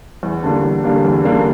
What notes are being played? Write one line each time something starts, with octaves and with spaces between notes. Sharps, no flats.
E2
D3 G3 A#3 D4
E2
D3 G3 A#3 D4
E2
D3 G3 A#3 D4